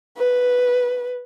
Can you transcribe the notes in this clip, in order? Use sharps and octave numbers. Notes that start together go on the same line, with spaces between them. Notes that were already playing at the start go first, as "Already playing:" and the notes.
B4